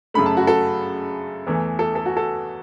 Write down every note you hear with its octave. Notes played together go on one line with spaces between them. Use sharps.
F#2 C#3 A3 B5
A5
F#4
A4
E2 E3 A3
A4
A4
F#4
A4